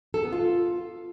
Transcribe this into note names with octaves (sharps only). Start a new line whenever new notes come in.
A4
B3
F4